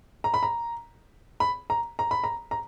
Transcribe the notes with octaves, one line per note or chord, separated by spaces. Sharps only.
A#5
B5
A#5
B5
A#5
A#5
B5
A#5
A#5